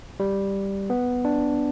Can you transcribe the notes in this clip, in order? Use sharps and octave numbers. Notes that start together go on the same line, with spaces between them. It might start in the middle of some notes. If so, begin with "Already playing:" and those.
G3
B3
D4